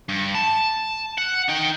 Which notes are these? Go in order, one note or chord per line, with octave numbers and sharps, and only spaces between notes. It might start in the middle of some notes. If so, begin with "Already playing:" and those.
G2
A5
F#5
D#4 G5